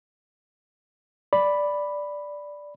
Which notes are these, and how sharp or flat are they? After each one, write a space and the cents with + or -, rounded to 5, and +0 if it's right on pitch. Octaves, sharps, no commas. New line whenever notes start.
D5 +0 B5 +0